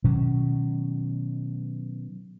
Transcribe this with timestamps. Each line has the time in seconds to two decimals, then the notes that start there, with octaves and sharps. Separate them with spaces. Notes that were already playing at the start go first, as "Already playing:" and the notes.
0.04 B2 D#3 F#3 C#4